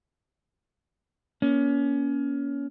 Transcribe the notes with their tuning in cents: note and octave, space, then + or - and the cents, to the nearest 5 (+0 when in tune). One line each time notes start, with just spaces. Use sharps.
A#3 +40 C#4 +25